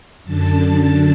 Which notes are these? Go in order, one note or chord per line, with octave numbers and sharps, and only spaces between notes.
F#2 D3 A5
A5